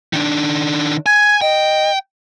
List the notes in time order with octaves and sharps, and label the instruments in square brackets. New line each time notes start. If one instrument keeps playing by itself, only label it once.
[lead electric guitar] D#3 D4
[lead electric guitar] G#5 [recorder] G#6
[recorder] D#5 [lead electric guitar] G5